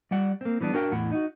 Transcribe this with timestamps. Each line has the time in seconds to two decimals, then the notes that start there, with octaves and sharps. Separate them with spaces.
0.11 G3 D5 F#5
0.41 A#3 C4
0.61 E3 G3 B3 D4
0.73 D4 F#4 A#4 G5
0.92 E2 A2 E4 F#5
1.11 D#4 F#4